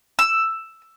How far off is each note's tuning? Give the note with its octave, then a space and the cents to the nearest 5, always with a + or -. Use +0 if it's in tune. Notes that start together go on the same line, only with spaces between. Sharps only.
E6 +5